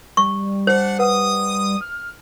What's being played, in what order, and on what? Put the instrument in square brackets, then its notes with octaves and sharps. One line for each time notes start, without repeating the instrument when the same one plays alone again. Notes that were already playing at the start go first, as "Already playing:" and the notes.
[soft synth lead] G3 [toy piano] C#6
[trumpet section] D4 F#5 [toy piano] C5
[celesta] B4 F#5 [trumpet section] D#6
[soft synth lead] F6